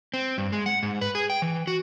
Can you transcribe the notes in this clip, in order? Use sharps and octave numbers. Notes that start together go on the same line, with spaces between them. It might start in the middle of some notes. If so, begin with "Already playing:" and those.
C4
G2
G#3
F#5
G#2
B4
G#4
G5
E3
F#4